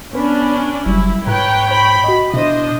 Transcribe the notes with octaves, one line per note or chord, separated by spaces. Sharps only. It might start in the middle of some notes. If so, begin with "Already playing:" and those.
B3 C#4 D4 B4 B5
F#1 F#3 G3 E4
G#2 B4 C#5 G5 A#5 F#6
C5 B5
F#4 D#5
B2 D4 E4 C5 D#5